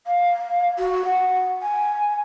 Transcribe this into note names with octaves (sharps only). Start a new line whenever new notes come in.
F5
F#4
F#5
G#5